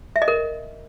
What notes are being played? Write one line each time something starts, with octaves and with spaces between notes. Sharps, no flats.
E5
D#5
A#4